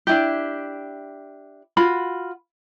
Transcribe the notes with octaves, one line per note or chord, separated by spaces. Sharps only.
D4 E4 G4
F4 F#4 B5